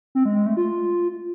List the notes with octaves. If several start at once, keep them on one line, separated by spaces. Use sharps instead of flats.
C4
G#3
G#3
A3
F4